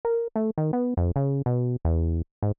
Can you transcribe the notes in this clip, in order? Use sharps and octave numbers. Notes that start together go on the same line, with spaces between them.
A#4
A3
D#3
B3
F2
C#3
B2
E2
G#2